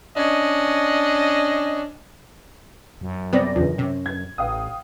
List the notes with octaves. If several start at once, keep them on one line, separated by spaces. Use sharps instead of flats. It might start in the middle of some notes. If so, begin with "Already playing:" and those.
C#4 D4 D#5
F#2
C3 G3 B3 C4 D5 A#6
E2 E3 F3
C3 C#4
G#6
A1 F5 G5 D#6